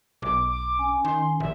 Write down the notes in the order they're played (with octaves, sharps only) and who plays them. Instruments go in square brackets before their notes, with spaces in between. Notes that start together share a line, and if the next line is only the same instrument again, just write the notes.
[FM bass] B1 [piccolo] D6
[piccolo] D6
[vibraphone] C#4 G#5
[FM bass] D#3 [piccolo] C6
[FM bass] A#1 [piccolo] E5